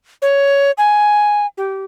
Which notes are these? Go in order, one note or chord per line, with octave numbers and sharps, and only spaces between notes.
C#5
G#5
G4